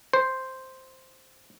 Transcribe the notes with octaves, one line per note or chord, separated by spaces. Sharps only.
C5